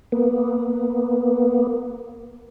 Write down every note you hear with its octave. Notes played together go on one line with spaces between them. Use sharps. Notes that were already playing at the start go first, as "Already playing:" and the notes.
A#3 B3